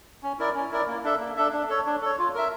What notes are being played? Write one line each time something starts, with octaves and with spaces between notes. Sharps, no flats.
C#4
E4 A#4 D5
C#4
E4 A#4 D5
A#3
D4 A4 E5
A#3
D4 A4 E5
D4
A4 C#5
D4
A4 C#5
F4
A#4 E5